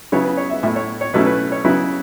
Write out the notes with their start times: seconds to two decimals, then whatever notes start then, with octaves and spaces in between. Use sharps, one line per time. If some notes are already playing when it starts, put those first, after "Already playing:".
0.12 C#3 F#3 B3 E4 C#5
0.25 B4
0.37 C#5
0.50 E5
0.63 A2 A3 E4 E5
0.76 C#5
1.01 C#5
1.14 B2 F#3 A3 C#4 E4 B4
1.26 B4
1.52 C#5
1.65 C#3 F#3 B3 E4 B4